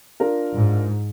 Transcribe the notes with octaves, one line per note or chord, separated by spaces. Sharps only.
D4 F4 A#4
G#2